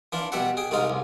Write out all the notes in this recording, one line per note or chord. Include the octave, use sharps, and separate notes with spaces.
E3 D4 F4
B2 G3 E5 F#5
G#4 G5
C2 G#2 G#3 D#4 F5
C2